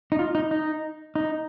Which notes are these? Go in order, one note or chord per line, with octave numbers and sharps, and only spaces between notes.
D#4
F4
D#4
D#4
D#4